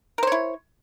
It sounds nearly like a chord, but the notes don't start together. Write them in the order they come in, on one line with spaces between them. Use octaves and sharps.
A#4 C5 C#5 E4